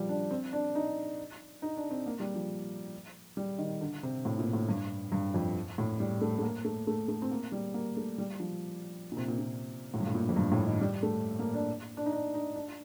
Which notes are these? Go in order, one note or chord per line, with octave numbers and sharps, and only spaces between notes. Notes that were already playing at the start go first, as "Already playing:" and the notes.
Already playing: F3 G3
D4
C4
D4
D#4
D#4
D4
C4
A#3
G3
F3
G3
D#3
D3
C3
A2
A#2
A2
G2
G2
F2
A2
G3
A3
A3
A#3
A3
A3
A3
C4
A#3
G3
A#3
A3
G3
F3
A#2
C3
A#2
A#2
A2
G2
A2
A#2
F2
G2
A2
D#3
G3
A3
A#3
D4
D4
D#4
D4
D#4
D4